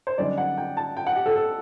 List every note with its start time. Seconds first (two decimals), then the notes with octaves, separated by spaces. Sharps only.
0.07 C5
0.18 F#2 D3 G3 A#3 D#4 D5
0.38 F#5
0.57 G5
0.77 A5
0.97 G5
1.07 F#5
1.16 G4
1.26 A4
1.36 A4